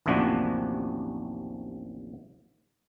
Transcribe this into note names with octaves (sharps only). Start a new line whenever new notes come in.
A1 D#2 C3 F3 D4 F#4